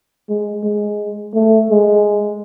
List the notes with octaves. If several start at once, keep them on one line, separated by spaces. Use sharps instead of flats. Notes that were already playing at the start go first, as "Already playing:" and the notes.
G#3
G#3
A3
G#3